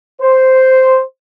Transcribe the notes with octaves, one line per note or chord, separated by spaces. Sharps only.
C5